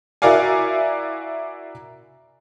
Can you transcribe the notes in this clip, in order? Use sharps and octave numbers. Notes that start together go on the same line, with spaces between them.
E4 F#4 A#4 D5 F5 G#5